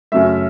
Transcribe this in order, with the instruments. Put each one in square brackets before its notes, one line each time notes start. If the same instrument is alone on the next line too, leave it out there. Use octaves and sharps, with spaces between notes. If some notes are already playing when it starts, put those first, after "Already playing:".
[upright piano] F#2 C#3 F#3 A3 E5